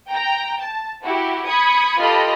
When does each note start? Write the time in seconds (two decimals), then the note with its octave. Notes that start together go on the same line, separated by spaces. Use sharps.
0.10 G5 A#5
0.61 A5
1.03 E4 F#4 G4
1.46 B5 D#6 G#6 C#7
1.99 F4 G4 A4 B4 D#5 B5